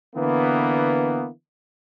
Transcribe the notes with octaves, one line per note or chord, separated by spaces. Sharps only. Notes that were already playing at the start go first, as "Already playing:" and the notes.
D3 E3 A#3 B3